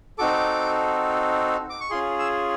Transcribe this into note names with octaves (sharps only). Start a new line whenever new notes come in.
C4 D#4 F#4 A4 D6
D6
C#6
C#4 F4 G#4 C6
E6